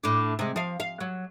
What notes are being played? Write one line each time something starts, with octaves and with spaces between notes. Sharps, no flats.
A2 D4
C3 G#3
F3 F5
F5
F#3